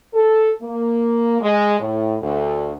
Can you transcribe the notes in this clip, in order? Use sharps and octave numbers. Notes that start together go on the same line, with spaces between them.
A4
A#3
G#3
A2
D2